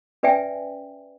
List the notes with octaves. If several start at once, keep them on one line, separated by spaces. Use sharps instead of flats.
C#4 B4 D5 E5 G5 G#5